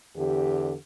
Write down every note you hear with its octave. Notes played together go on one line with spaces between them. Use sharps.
E2 D3 G4